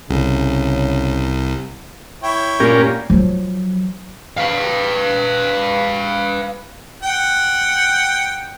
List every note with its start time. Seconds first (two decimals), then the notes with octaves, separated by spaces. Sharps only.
0.10 C2 C#3
2.23 E4 C#5 G5
2.60 A#2 C#4 G4 A#4
3.10 F3 F#3
4.37 B4 F5
7.03 F#5 G5